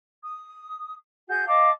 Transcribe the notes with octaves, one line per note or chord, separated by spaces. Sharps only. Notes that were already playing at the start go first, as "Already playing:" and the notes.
D#6
F#4 G#4 G6
D#5 F5 A5 D6